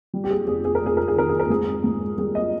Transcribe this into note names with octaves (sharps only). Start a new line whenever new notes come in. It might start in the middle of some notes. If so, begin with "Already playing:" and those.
G3
G4
G#4
F1 G#4
G#4
A#4
F1 G#4
A#4
G#4
D#3 A#4
G#4
A#4
G#2 G#4
G#2
G3 G#4
D#5